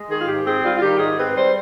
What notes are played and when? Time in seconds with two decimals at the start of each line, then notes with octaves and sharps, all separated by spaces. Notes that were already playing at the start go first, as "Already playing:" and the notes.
Already playing: G#3
0.09 D#3 G#4
0.20 F4
0.27 G#2 G4
0.45 C4 G#4
0.63 G3 F4
0.75 F4
0.81 D#3 G4
0.99 G#2 G#4
1.18 C4 B4
1.35 G3 C5